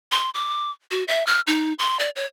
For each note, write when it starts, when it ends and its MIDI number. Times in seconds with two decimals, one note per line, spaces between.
0.12 0.30 84
0.34 0.71 86
0.91 1.04 66
1.08 1.26 76
1.27 1.40 89
1.47 1.73 63
1.79 1.98 84
2.00 2.10 74
2.16 2.25 73